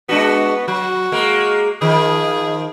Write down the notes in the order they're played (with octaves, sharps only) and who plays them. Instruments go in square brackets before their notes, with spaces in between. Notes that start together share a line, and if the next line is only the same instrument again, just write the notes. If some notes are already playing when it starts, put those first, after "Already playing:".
[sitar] G#3 D4 F#4 [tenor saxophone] B3
[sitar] F#3 [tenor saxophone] F#4
[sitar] G#3 A#3
[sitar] D#3 F3 [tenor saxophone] G#4